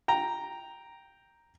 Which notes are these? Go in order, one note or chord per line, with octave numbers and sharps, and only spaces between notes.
G5 A#5